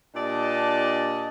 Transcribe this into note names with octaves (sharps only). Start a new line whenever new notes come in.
A#2 D4 G4 D5 D#5 A5